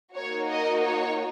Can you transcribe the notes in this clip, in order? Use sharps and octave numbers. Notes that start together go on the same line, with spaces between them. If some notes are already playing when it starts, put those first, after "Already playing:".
A#3 D#4 F#4 C#5
D#5
C#5